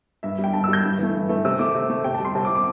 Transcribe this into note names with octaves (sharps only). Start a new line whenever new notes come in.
G2 E5
G3
G5
G2 A5
E6
G3 G6
G2
E3 A3
G2
E3 A3
C3 E6
A3 D6
C3
A3
C3 G5
A5
G3 C6
C3 A5
D6
G3
D6